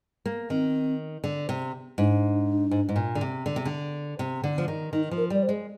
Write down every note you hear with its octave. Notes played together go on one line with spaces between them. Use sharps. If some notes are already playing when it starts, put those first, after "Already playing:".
A#3
D#3 C4
D3
C3
G#2 D4
G#2
G#2
A#2
D3
C3
D3
C3
D3
C3
D3
F3
D#3
D#3 D#4
F3
A#4
G3 D5
C5
G#3